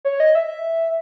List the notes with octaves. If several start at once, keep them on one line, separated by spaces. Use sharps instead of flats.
C#5
D#5
E5